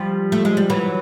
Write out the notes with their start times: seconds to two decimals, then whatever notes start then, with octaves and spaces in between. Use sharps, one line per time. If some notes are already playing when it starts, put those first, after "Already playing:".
Already playing: F3 G3
0.32 A3
0.45 G#3
0.57 G3
0.70 E3 F#3